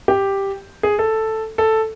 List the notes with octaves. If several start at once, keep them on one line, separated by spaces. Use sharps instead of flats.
G4
G#4
A4
A4